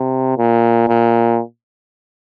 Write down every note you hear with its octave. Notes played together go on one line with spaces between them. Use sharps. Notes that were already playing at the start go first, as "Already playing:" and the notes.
Already playing: C3
A#2
A#2